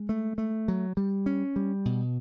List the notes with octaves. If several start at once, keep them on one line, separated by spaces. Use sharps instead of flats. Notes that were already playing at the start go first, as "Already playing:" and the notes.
Already playing: G#3
A3
A3
F#3
G3
C#4
G3
B2